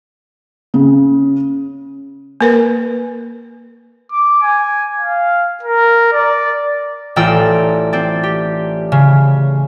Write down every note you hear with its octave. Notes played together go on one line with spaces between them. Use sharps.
C#3
A#3 A#4 B4
D6
G#5
F5
A#4
D5
A1 F4 D5 G5 A#5 E6
C4 D5
G4
C#3